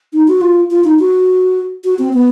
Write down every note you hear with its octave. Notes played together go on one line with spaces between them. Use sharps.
D#4
F#4
F4
F4
D#4
F#4
F#4
C4
B3